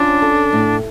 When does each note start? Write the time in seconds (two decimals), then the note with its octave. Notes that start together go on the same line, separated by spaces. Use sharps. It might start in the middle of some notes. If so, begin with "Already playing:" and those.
Already playing: C#4 D4 F4
0.22 A4
0.53 A2